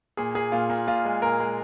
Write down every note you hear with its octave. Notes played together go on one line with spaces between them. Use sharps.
A#2 G#4
A#2 G#4
A#2 F4
A#2
A#2 F4
G#3
A#2 A#4
G#3